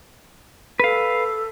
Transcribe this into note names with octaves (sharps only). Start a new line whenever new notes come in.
A4 B4 F5